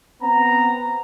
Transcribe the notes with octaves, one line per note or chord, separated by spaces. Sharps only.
B3 C4 A#5